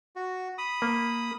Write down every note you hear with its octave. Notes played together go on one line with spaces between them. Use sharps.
F#4
B5 D#6
A#3